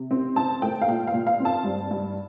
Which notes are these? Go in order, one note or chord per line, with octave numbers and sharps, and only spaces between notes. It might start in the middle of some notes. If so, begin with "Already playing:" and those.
Already playing: C3
C4
C4 A5
A3 G5
F5
A#2 G5
F5
A#2
F5
C4
A5
G2
G2